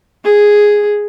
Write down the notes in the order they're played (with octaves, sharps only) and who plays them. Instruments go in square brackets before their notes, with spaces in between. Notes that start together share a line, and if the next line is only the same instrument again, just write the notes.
[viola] G#4